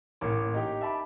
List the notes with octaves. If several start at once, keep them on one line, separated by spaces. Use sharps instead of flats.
A1 A#3 C#5 D6
D#4 G4
E5 A5 B5 D6